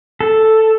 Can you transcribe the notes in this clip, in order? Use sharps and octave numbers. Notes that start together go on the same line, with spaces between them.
A4